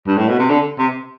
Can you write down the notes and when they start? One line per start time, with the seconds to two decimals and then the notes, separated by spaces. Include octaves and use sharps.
0.07 G2
0.17 A2
0.29 B2
0.39 C3
0.50 D3
0.79 C3